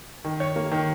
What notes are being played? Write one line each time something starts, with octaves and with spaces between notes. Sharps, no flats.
D#3
C#5
A#3
D#3